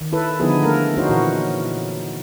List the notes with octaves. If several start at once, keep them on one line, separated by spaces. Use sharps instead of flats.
D#3
E4 A4 B4
D3 F3 B3 D#4 E4 G#4
D3 A3 A#3 A4 A#4
C#4 D#4 F#4 C5
A#2 E3 F#4